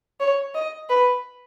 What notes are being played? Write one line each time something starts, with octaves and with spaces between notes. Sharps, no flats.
C#5
D#5
B4